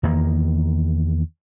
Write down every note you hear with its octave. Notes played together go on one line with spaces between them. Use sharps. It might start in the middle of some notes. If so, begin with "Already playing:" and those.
E2 D#3 A#3